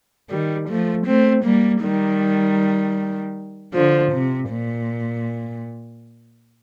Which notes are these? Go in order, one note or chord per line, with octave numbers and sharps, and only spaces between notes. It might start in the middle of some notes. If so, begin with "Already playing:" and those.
D#3 G3
F3 A3
A3 C4
G3 A#3
D#3 G3
D3 F3
C3
A#2